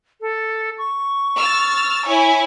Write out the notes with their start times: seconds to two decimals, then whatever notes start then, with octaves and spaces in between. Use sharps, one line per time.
0.21 A4
0.78 C#6
1.37 E6 F6 A6
2.07 E4 C#5 G#5